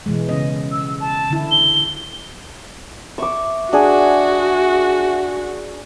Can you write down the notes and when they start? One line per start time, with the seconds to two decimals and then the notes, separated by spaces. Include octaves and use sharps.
0.06 B2 E3 G#3
0.29 C#3 C#4 D#5
0.72 E6
1.00 A5
1.30 D3 E4
1.51 G7
3.18 E5 C#6 D6
3.73 D4 F#4 G#4 E5 F#5 G#5